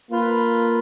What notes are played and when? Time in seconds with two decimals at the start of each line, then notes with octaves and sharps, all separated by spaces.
0.11 A#3 F4 B4